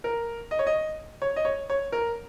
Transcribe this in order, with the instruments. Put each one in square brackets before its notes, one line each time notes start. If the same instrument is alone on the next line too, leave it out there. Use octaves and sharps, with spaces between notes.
[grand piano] A#4
D#5
C#5
D#5
C#5
D#5
C#5
C#5
A#4